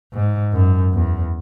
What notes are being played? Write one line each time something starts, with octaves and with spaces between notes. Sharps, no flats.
G#2
F#2
E2